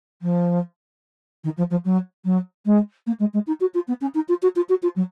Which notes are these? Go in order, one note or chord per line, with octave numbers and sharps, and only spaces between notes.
F3
D#3
F3
F3
F#3
F#3
G#3
A#3
G#3
G#3
D#4
F#4
F4
B3
C#4
D#4
F4
F#4
F4
F#4
F4
F#3